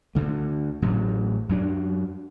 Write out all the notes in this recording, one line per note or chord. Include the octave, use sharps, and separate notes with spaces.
D2 D3 A3
A1 A2 F#3
F#2 F#3 D4